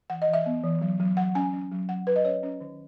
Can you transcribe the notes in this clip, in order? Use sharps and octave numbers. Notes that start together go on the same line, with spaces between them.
E3 F#5
D#5
E3
E5
B3
E3
F#3
F#3
F#3 F#5
C#4 G#5
C#4
F#3
F#3 F#5
F#3 B4
D#5
C#4 C#5
C#4
D#3